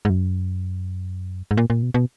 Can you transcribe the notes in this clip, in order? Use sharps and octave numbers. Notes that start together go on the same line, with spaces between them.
G#2
F#2
G#2
A#2
A#2
B2
B2